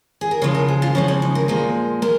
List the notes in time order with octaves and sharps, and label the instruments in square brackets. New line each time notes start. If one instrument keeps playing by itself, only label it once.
[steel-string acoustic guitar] G#4
A#4
C#3 F3 G#3 C#5
A#4
G#4
F4
C#3 F3 G#3 C#4
C#4
D#4
A#4
A#2 F3 G#3 A#4
G#3 A#4